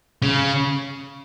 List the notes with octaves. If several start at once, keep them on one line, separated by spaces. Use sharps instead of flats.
C#3